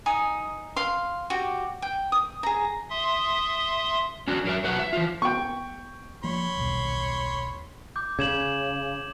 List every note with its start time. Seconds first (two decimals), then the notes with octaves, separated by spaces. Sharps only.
0.06 D#4 G#5 D#6
0.76 F5 C6
1.30 F#4 G4
1.82 G5
2.12 D#6
2.43 G#4 A#5
2.90 E5 C6 D#6
4.28 C#4 D4 F#4
4.45 F#3 A#4 E5
4.64 F#3 F#4 B4 F#5
4.79 E5
4.93 E3 F4
5.22 B3 G5 C#6
6.24 F3 A#3 C#5 B5 C6
6.57 D#1 B1
7.96 D6 G6
8.19 C#3 G#6 E7 F#7